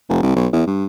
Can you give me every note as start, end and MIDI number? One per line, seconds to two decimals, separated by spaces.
0.09 0.21 29
0.23 0.35 36
0.36 0.48 35
0.53 0.62 40
0.67 0.86 43